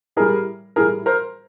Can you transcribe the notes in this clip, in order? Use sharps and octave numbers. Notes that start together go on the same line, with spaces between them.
A2 E3 G3 G#4 A#4
A2 E3 G3 G#4 A#4
A#4 C5